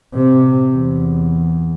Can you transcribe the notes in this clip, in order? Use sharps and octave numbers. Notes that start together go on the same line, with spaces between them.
C3
E2